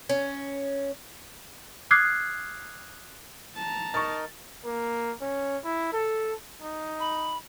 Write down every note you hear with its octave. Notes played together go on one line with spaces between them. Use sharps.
C#4
D6 D#6 F6 F#6 G#6 C7
A5 A#5
D#4 A#4 D#5 C#6 A6
A#3
C#4
E4
A4
D#4
B5